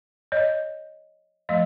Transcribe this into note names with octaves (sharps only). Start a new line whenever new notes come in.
C#5 D#5
F3 A3 D#5 F5